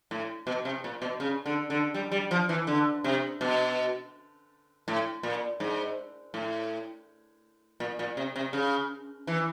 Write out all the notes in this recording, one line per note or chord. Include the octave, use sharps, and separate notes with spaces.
A2
B2
C3
A#2
B2
C#3
D3
D3
G3
G3
F3
E3
D3
C3
B2
A2
A#2
G#2
A2
A#2
A#2
C3
C3
C#3
E3